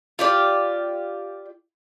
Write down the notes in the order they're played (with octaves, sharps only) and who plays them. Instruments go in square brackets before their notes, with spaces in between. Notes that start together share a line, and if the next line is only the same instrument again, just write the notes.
[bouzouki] F4 G4 D5